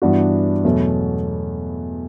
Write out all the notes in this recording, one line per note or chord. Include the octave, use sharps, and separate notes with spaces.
G2 E3 B3 D4 F#4
E2 B2 F#3 A3